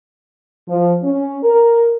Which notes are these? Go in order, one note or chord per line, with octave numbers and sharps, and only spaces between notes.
F3
C#4
A#4